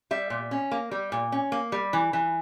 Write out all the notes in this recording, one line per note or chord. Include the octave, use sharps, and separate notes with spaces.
G3 E5
A#2
C#4
A#3
G3
A#2
C#4
A#3
G3
E3
E3